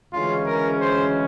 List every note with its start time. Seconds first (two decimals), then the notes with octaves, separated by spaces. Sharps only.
0.12 D2 C#3 E3 G#3 C#4 F4
0.46 A#4
0.80 C5